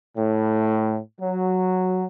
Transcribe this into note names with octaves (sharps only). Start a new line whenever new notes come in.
A2
F#3